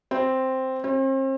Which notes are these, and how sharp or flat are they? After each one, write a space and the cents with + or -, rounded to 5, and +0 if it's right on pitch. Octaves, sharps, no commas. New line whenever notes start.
C4 +0
C4 +40